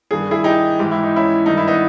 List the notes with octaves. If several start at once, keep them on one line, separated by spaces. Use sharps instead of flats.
G2 D#3 G#4
E4 G#4
D#4 G4
G#2 E3 G4
E4
D#4
C#4 E4
G2 D#3 D#4
E4
B3 D#4